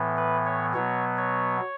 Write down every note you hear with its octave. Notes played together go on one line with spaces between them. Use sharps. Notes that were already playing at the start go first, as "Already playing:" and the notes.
Already playing: A2 E3 B3
B4
C#5
B2 F#3 B3 C#5
C#5